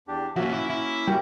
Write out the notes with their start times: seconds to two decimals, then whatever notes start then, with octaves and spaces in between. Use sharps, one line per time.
0.08 E2 D4 G4
0.36 F2 A#2 A#3 C#4 F#4 E5
0.51 E4
0.70 E4
1.08 G3 F#4 A#4